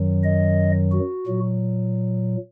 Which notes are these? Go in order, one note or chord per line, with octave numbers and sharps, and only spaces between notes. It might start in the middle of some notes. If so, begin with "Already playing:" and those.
Already playing: F#2 D#3 F#3
D#5
F#4
A#2 F#3